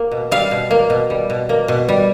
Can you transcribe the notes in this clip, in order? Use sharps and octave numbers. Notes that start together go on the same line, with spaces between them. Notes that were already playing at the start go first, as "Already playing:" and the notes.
Already playing: A#3
B2
G3 F5
B2
A#3
B2
G3
B2
A#3
B2
G3